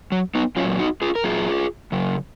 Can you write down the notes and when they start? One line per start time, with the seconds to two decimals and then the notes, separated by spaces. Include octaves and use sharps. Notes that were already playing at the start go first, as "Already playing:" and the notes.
0.12 F#3
0.35 B3 D#4
0.56 F#3 C#4 F4
0.60 A#2
0.79 D#4 F#4
1.02 F4 G#4
1.15 A#4
1.24 A#2 F#3 F4 G#4
1.92 C#3 F#3